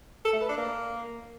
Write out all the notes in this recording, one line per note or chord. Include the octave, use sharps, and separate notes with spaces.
A4
A3
B4
D4
A#3